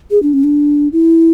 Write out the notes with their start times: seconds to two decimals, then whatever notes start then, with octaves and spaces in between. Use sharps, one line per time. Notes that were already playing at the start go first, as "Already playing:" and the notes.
0.11 G#4
0.23 D4
0.33 C#4
0.44 D4
0.93 E4